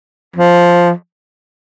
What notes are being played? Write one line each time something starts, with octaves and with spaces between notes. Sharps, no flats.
F3